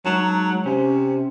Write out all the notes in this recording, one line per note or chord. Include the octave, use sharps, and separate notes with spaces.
F#3 G#3 D#4 A5
C3 C#4 C5